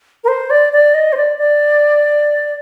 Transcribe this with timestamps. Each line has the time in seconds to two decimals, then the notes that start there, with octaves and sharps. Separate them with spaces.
0.24 A#4
0.28 C5
0.50 D5
0.73 D5
0.94 D#5
1.13 C5
1.17 D5
1.38 D5